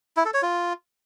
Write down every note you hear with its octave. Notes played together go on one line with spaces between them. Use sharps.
E4
A4
C#5
F4